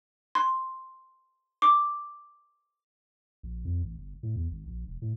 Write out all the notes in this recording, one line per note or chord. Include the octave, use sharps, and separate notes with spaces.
C6
D6
A#1
F2
A1
G1
A2
E2
G#1
A#1
E1
A2